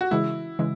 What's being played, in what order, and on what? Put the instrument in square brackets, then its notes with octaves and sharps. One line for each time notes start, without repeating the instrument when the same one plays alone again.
[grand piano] F#4
[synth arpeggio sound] C#3 E3 G#3 [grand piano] E4
[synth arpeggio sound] C#3 E3 G#3